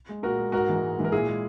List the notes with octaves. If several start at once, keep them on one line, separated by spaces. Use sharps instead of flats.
G#3
A#2 F#4 A#4
G#3
G#2 F#4 A#4
E3 G#3
G#2
E3 G#3
A#4
A#2 E4 G#4
G#3